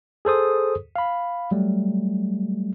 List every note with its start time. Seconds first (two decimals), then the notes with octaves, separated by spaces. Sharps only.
0.25 G#4 A4 C5 D#6
0.96 F5 B5
1.51 F#3 G3 A3